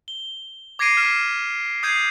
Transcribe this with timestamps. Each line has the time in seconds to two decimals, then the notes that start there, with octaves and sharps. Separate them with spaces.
0.08 G7
0.79 D6 G#6 A#6 C7 D7 D#7
0.97 F6 B6 E7
1.83 D#6 G6 G#6 C7 D#7